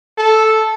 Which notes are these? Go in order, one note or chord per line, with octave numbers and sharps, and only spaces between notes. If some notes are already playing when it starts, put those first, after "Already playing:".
A4